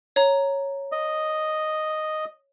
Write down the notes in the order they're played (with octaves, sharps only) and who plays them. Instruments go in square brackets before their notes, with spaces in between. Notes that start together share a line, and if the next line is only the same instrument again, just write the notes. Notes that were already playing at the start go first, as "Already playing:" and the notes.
[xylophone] C#5 A#5
[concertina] D#5